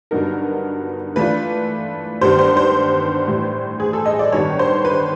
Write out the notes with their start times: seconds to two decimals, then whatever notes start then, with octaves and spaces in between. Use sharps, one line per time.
0.11 G2 D3 F#3 B3 D#4 A#4
1.16 E3 A3 D4 F4 B4
2.21 G2 D#3 G3 B3 C5
2.39 C5
2.57 C5
3.27 A2 E3 G3
3.80 G#4
3.93 A4
4.06 D#5
4.19 D5
4.32 G2 D#3 G3 B3 C#5
4.59 C5
4.85 B4